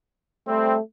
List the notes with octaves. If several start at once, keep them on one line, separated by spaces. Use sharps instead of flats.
G3 A3 C4